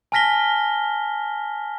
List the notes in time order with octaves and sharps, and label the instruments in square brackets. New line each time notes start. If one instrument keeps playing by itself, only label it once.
[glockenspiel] G#5 A5 F6 A#6 B6 G7